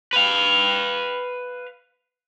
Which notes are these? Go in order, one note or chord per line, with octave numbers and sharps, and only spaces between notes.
B4 F5